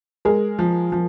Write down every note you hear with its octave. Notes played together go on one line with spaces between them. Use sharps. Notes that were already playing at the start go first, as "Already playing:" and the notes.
G#3 G#4 A#4
F3
F3